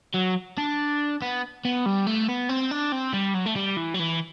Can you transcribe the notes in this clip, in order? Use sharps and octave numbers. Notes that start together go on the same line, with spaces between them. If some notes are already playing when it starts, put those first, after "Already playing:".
F#3
D4
B3
B3
G3
A3
B3
C4
D4
C4
G3
F#3
A3
G3
E3
F#3
E3